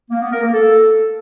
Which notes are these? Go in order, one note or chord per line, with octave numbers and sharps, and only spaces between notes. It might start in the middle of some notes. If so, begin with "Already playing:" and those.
A#3
B3
A#4
A#3
A4